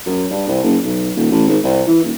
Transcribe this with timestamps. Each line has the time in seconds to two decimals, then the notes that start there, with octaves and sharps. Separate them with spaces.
0.06 F#2
0.30 G2
0.47 C2
0.64 F#1
0.83 B1
1.15 D#1
1.31 A1
1.48 G#1
1.64 C2
1.87 E3
2.04 D#1